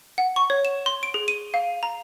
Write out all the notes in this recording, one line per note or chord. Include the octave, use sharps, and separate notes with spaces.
F#5
C#6
C#5
E7
C6
D7
G#4
D#7
F5
A#5